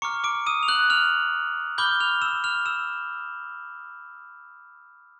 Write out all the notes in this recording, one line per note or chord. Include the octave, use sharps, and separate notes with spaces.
A#5 C#6 D6 F6 C#7
D6 D7
D#6 D#7
F7
F#6 F#7
F6 F7
B5 D6 F6 G6 G7
F6 F7
E6 E7
F6 F7
E6 E7